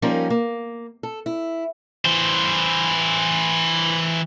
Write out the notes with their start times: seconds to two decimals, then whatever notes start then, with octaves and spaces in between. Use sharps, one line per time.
0.02 F3 G3 A#3 C#4 D#4 A#4
0.30 A#3
1.03 A4
1.26 E4
2.05 E3 C5